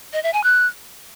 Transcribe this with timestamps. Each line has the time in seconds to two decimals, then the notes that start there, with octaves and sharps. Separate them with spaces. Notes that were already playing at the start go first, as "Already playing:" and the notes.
0.13 D#5
0.23 E5
0.33 G#5
0.44 F#6